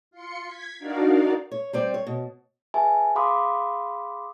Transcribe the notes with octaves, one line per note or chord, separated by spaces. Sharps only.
F4 C6 C#7
G#6 B6
D4 D#4 F#4 A#4 D5 F5
C#5
G3 C4 D5
C#5
B2
G#4 B4 E5 G#5 A5
G#4 F5 B5 C6 D6 D#6